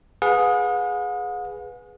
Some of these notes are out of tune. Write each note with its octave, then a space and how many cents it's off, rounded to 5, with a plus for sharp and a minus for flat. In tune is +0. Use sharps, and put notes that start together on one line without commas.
G#4 +0 B4 +0 F#5 -45